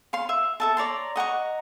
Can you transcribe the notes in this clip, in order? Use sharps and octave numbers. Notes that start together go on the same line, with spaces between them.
F5 C6
E5
A4 E5 A5
C#5 D5 A#5 C6
D#5 F#5 A#5 C#6